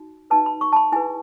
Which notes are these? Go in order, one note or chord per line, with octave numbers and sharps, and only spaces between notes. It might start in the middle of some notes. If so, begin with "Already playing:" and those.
Already playing: D#4 F#4
D#4 F#4 B4 A5
B5
C#6
A5
B5
E4 G#4 B4 G#5